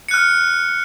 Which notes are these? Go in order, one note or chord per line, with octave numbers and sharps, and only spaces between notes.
F6 F#6 C#7